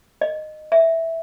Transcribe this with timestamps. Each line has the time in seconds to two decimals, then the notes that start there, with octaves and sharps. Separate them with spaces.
0.21 D#5
0.72 E5